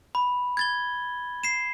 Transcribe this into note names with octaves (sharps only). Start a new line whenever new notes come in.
B5
G#6 A6 G7
C7 E7